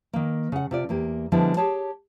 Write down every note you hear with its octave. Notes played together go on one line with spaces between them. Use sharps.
D#3 A#3
C#3 F#5
C3 F4 D5
E2 A#3 G4
D3 F3 G3 G#3 B3 E4
G4 G#4 C#5 A5